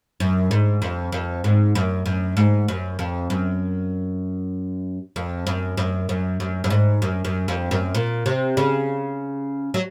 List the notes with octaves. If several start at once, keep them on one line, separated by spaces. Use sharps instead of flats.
F#2
G#2
F2
F2
G#2
F#2
F#2
G#2
F#2
F2
F#2
F2
F#2
F#2
F#2
F#2
F#2
G#2
F#2
F#2
F2
F#2
A#2
C3
C#3
F#3